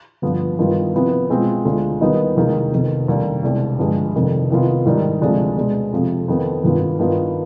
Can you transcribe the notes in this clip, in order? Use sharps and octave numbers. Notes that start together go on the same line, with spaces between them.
G1 G2 F3 B3 F4
G2 D#3 G3 B3 F4
C2 C3 F3 B3
B2 G#3 C4 F4
D2 D3 G#3 D4 F4
D#2 D#3 G3 B3 D#4
F1 D#2 D#3 G#3
F1 F2 D#3 B3
F1 D#2 D3 G3 D4
C2 B2 G#3 D4
G1 G2 F3 G#3 D4
F1 F2 D#3
C2 C3 D#3 B3 F4
G#2 D#3 G3 D4
D2 C3 F3 G#3 D4
B2 G#3 D4
F2 C3 F3
F2 D#3 B3
G#1 G2 D#3 B3 F4
G2 D#3 B3 F4